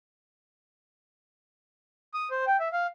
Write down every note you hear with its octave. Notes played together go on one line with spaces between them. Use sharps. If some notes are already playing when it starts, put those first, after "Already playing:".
D#6
C5
G5
E5
F5